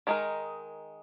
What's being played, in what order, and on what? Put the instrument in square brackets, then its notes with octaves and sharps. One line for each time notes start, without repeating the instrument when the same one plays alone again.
[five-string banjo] D#3 G#3 D#4 A#4